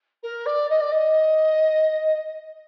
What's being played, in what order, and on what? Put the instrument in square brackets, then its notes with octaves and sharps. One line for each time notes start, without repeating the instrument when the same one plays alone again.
[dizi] A#4
D5
D#5
D5
D#5